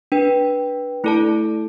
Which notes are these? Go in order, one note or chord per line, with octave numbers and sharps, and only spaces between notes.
D4 B4 G5
A3 E4 A4 D5 A5